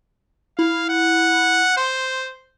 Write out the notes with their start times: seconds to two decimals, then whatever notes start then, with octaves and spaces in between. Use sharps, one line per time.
0.59 E4 F5
0.90 F#5
1.77 C5 C6